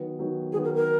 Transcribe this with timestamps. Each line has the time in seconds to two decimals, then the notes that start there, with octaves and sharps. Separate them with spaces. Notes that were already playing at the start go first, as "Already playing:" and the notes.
Already playing: D#3 F#3 B3
0.19 D#3 F#3 B3
0.52 D#3 F#3 B3 G#4
0.64 A#4
0.75 A#4